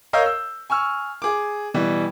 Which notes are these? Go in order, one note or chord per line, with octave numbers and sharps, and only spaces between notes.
A#4 C#5 D#5 F5 E6 G6
E6
G#5 C#6 E6 F6
G#4 D6
B2 E3 G3